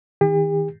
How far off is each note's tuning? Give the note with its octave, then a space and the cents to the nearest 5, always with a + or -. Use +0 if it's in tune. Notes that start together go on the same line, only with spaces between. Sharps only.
D#3 +20 G4 +45